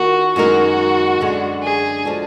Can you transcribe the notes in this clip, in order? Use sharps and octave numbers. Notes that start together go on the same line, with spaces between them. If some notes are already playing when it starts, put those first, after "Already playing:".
Already playing: D#3 A#3 F4 F#4 A#4
F#2 D#3 G#3 D#4 F#4 A#4
F#2 D3 G#3
G#4
D3 F3 G#3 D4 F#4